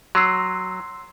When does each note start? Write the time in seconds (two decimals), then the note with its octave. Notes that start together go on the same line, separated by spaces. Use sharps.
0.15 F#3 C6 E6 C7